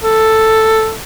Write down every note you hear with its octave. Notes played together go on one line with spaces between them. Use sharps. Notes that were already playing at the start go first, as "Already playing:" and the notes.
A4